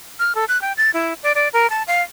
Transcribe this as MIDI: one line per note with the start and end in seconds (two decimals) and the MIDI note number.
0.19 0.33 89
0.35 0.45 69
0.49 0.60 90
0.62 0.73 79
0.77 0.90 93
0.94 1.14 64
1.23 1.33 74
1.35 1.48 74
1.53 1.69 70
1.70 1.83 81
1.87 2.02 77